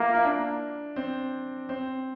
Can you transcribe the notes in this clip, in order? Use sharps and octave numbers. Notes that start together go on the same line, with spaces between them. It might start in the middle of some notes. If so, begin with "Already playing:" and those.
Already playing: A#3 E4 F4
E4
D4
C4
C4